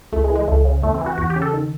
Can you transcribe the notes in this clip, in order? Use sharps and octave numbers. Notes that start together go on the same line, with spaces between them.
C#2 A3
G#3
E3
G#3
C#2 A3
C#3
E2 A3
C4
E3
F#4
E2 F#4
G4
C#3
A4
D#3